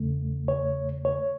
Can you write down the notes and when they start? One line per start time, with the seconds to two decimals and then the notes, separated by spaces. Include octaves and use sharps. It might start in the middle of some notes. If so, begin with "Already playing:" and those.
Already playing: E2 C#3 A3
0.48 C#5
1.05 C#5